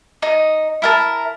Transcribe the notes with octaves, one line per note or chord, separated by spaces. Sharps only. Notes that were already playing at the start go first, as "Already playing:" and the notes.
D#4 D#5
E4 A#4 A5